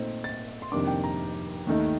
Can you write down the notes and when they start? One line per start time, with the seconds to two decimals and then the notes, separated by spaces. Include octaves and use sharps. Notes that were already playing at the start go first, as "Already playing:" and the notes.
Already playing: A#2 A3 C4 D#4
0.24 A6
0.62 C6
0.72 F2 C3 D#3 A#3 D4 D6
0.87 G5
1.04 A#5
1.67 D#2 D#3 A3 D#4